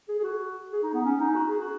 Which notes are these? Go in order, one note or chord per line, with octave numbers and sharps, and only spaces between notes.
G#4
G#4
F#4
G#4
D#4
B3
C#4
D#4
F#4
G#4
F#4